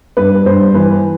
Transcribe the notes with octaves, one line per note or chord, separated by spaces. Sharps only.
G2 B4
G2 C5
E3 B4